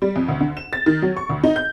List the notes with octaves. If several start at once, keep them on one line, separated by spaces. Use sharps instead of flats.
G3
F2
D2
D3
E7
A6
D#3
F#3
C#6
D2
D#4
G6